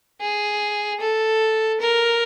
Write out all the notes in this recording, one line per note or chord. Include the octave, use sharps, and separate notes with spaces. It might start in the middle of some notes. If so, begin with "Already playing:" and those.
G#4
A4
A#4